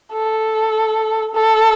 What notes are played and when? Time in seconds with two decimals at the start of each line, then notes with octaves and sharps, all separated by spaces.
0.12 A4
1.35 A4